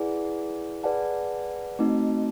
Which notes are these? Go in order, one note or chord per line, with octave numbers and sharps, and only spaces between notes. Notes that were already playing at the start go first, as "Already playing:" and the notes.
Already playing: E4 G#4 B4 D5 F#5
G#4 B4 D5 F#5 A5
A3 C4 D#4 F#4